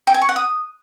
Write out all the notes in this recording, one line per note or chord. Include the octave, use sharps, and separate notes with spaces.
G5
G#5
C#6
F#5
D#6